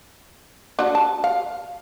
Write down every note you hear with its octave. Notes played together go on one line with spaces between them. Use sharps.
D4 F#4
A5
F5